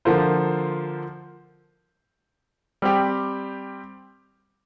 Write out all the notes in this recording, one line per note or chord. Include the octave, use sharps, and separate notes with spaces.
D3 F3 A#3 F4 C5
G3 C4 G4